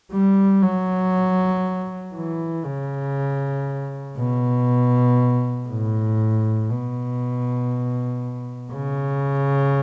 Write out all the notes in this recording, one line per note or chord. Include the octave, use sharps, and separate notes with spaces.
G3
F#3
E3
C#3
B2
A2
B2
C#3